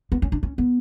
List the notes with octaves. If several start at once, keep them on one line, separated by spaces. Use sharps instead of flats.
B3
C#4
D4
C#4
B3